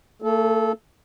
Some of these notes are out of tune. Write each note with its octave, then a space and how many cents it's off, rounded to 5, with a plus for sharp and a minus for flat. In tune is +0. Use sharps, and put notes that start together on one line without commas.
A3 +45 A4 -20